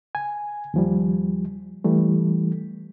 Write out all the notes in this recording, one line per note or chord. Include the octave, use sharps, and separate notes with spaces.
G#5
D#2 F3 G3
E3 G3 A3